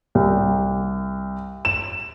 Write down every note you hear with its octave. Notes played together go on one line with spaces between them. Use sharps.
C2
E7